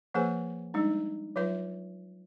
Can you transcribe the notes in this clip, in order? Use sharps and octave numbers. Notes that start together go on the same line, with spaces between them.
F3 A#3 G#4 B4 C5 G#5
G3 G#3 D4 D#4
F#3 F4 B4 E5